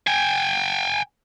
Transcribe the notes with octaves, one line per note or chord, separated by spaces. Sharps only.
G5 G#5